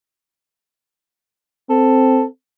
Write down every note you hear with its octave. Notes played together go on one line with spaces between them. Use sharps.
C4 A4